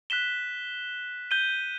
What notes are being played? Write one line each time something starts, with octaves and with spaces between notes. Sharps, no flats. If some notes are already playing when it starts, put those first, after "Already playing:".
F#6 B6 E7 G7
G6 D#7 G7